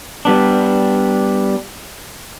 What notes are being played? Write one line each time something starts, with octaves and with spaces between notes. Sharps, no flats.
G3 B3 D4